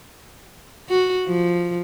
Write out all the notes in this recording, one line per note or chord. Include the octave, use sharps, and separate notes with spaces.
F#4
F3